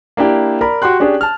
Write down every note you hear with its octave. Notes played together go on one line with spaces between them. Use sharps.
A#3 D4 E4 G4
A#4 D5 A#5 B5
F#4 G4 G5 C6 F#6
C#4 D4 G4 G#4 C#5 D5
A5 F6